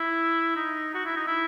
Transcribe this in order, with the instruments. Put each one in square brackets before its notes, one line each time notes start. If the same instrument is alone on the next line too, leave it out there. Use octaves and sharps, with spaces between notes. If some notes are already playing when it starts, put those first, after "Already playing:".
Already playing: [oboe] E4
D#4
F#4
E4
D#4
E4